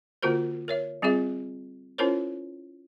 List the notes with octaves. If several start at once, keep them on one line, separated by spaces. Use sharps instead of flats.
D3 A#3 F4 F#4 A#4 C5
A#4 C#5 E5
G3 C4 F4 G#4 E5
C#4 E4 F4 A#4 C5 C#5